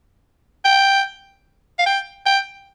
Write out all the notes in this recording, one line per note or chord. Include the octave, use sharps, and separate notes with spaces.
G5
F5
G5
G5